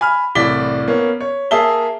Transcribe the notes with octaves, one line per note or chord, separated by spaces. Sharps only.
G#5 B5 F6
C2 A2 E3 D5 B6 G7
A#3 B3 C#4
C#5
A#3 G#4 E5 A5 G7